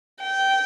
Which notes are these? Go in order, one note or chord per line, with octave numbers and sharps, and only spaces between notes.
G5